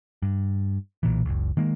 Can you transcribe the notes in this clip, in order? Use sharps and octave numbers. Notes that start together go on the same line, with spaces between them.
G2
B1 A#2 E3
F#1 C#2
D#3 G#3 A#3